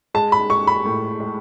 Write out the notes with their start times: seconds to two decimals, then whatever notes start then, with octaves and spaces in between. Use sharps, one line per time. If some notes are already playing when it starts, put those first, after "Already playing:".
0.14 G#3 A5
0.32 B5
0.50 G#3 C#6
0.67 B5
0.85 A2
1.20 G#3